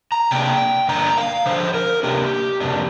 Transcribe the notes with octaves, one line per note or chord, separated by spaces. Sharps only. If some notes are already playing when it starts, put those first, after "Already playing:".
A#5
C3 A#3 D4 G5
G2 D3 A#3 D4 A#5
F5
D3 F3 D4 C5
A#4
C3 A#3 D4 G4
F2 C3 A#3 D4